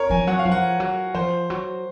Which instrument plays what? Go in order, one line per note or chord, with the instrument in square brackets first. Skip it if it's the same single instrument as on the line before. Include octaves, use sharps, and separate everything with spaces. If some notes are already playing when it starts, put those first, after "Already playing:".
Already playing: [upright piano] A#4 C#5
[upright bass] F3 [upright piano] G#5
[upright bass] F#3 [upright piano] F#5
[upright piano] F5
[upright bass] F3
[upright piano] F#5
[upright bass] F#3
[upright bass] F3 [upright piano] C5
[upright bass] F#3